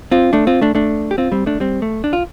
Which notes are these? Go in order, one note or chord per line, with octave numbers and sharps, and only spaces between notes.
C4 F4
A3 D4
C4 F4
A3 D4
A3 D4
G4
C4 F4
G3 C4
A3 D4
G3 C4
A3
D4
F4